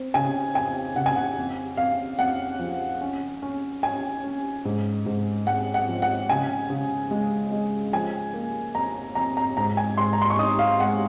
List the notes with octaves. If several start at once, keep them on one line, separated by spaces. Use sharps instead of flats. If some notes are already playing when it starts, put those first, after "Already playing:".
Already playing: C4
C#3 G#5
F2 G#5
C#3 F#5
G#5
F#5
F2
F2 F5
F2 F#5
F3
C#4
C#4
C#4 G#5
C#4
G#2
G#2
G#3 F#5
F#5
F3
F#5
C#3 G#5
C#3
G#3
G#3
F3 G#5
A#3
F2 A#5
F2 A#5
A#5
G#2 A#5
G#5
G#2 C6
A#5
C6
C#6
D#4 D#6
F5
G#3 F#5